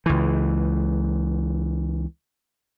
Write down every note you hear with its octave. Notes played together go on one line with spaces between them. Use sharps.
C#2 E3